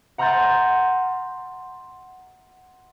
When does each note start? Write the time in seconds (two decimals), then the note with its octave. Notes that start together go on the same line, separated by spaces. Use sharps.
0.18 F#5 A#5 C6 F6 G6 A6